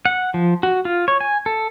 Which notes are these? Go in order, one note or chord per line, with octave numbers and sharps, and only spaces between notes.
F#5
F3
F#4
F4
C#5
G#5
A4